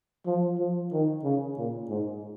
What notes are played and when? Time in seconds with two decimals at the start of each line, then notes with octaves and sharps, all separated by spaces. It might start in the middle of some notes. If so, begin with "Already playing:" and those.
0.26 F3
0.59 F3
0.92 D#3
1.24 C#3
1.58 A#2
1.89 G#2